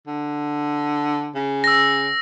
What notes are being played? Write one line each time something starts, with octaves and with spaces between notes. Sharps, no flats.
D3
C#3
E6 A#6